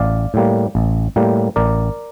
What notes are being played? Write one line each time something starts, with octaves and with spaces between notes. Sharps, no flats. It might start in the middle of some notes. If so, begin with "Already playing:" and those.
Already playing: A1 D5 F5
A2 G3 A#3
A1
A2 G3 A#3
A1 A#4 D5